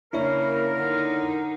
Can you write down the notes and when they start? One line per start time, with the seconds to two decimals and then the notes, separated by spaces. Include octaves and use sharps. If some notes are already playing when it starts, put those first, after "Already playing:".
0.13 C#3 A#3 D4 E4 A#4 C#5
0.76 D3 D#4